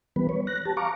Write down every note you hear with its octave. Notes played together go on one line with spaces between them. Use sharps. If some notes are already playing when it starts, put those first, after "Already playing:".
E3 G3 B3 B4
B4 C#5
F#6 A#6
G4 A5
F5 A#5 C#6 D6